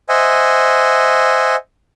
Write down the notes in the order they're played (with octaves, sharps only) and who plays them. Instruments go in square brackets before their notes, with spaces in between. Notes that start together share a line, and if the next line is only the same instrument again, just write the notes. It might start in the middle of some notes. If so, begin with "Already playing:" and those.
[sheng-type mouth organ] C5 D#5 E5 F#5 G#5